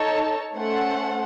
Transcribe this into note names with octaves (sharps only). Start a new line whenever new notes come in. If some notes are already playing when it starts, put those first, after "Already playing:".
Already playing: D#4 A4 C#5 A5
A3 C#4 A4 C5 F#5